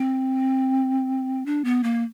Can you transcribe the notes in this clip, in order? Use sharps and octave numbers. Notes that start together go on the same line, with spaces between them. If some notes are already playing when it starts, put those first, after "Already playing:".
Already playing: C4
D4
B3
A#3